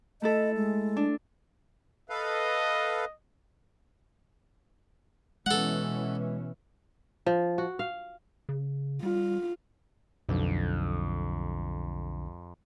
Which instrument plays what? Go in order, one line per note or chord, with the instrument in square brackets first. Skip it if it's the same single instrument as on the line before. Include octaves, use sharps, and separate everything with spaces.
[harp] A3 E4 A4 [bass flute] D#5
[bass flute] G#3
[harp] D4
[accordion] A4 B4 F5 [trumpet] D#5
[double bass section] B2 E3 C#4 [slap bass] G#3 [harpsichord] A4 F#5
[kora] F3
F#4
F5
[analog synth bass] C#3
[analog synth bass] G3 [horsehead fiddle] F4
[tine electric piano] B1 D3 [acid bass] F2